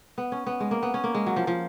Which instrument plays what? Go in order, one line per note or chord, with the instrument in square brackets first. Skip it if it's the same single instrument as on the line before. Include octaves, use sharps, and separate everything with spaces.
[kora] B3
C#4
B3
G#3
A#3
B3
C#4
A#3
G#3
F#3
F3
F3